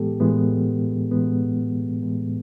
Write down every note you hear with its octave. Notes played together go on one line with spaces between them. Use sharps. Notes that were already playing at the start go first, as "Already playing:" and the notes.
Already playing: A2 E3 G#3 B3 G4 A4
A2 E3 G#3 B3
A2 E3 G#3 B3
A2 E3 G#3 B3